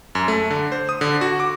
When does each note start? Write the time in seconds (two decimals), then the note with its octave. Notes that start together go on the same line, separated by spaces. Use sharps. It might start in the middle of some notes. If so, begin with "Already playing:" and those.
0.15 F#2
0.28 A3
0.50 D3
0.72 C5
0.89 D#6
1.01 D3
1.21 F#4
1.40 D6